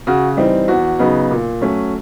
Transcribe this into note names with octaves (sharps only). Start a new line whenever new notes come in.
C#3 F#4
E3 G3 C4 D#4
E2 F#4
C#3 F#3 B3 D#4
A#2
F#3 A3 C#4